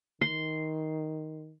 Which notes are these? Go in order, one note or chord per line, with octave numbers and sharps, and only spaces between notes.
D#3 C6